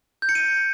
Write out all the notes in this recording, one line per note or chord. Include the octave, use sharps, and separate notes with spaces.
G6
C#7
D#7